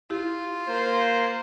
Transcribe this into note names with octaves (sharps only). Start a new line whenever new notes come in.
E4 F4 G4
A#3 C5